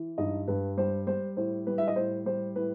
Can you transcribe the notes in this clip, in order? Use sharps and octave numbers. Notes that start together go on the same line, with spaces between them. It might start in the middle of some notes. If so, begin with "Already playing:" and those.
Already playing: E3
G2 D#4 D#5
G2 B4
G3 C5
G3 C5
A2 C5
G3 B4
E5
D#5
A2 C5
G3 C5
A2 B4